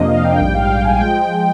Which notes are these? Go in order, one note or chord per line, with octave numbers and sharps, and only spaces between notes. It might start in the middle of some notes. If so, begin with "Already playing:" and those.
Already playing: F2 C3 F3 A#3 D4 D#5
F5
G5
A#1 G#2 G3 G5
F5
G5
G#5
F3 G#3 G5